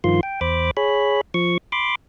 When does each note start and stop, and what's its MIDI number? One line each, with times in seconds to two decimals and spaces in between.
0.04 0.21 43
0.04 0.21 51
0.04 0.21 53
0.04 0.21 65
0.04 0.21 84
0.23 0.40 79
0.41 0.71 40
0.41 0.71 72
0.41 0.71 83
0.41 0.71 86
0.77 1.21 68
0.77 1.21 73
0.77 1.21 83
1.34 1.58 53
1.34 1.58 85
1.72 1.95 83
1.72 1.95 84
1.72 1.95 86